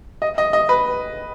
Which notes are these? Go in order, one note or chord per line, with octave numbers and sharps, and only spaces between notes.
D#5
D#5
D#5
B4